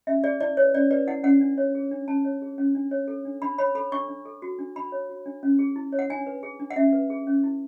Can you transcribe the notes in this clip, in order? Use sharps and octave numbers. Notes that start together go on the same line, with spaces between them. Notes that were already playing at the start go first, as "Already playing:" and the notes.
C#4 E5
G#4 D5
E4 D5
B4 C#5
C#4 D5
B4 D5
E4 F#5
C#4 F#5
D4
C#5
G#4
D4
C#4 A5
C#5
G#4
C#4
D4
C#5
A4
D4
D4 B5
C#5 B5
A4 B5
D4 C#6
D4
A4
F#4
D4
D4 B5
C#5
F#4
D4
C#4
G#4
E4
C#5
F#5
D4 G#5
B4
G#4
D4
F#5
C#4 E5
B4
G#4
C#4
E4